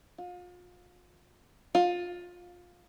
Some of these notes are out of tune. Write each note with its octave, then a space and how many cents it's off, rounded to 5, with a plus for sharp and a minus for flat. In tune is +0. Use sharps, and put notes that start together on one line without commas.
F4 +35
F4 +20